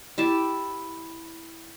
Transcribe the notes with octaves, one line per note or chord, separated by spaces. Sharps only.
E4 G4 A5